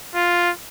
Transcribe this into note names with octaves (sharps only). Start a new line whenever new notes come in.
F4